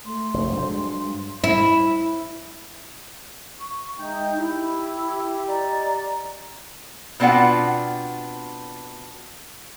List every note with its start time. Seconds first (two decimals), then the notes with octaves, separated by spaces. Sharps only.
0.05 A3 C6
0.34 F1 A2
0.52 G2 F#3 C5
0.65 G#3
1.44 E4
3.60 C#6
3.99 G#3 D#4 E5 G5 G6
4.37 E4 G4
5.47 D5 D#5 A#5
7.20 B2 C4 D4 F4 F#5